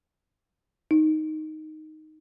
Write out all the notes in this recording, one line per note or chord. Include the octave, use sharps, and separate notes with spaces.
D#4